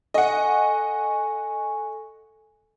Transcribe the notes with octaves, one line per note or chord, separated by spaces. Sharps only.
A4 D#5 F#5 G#5 C#6